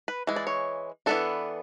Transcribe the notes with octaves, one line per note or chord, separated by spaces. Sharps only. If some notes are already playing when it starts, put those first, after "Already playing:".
B4
E3 G#3
D5
C#5
E3 B3 D4 A4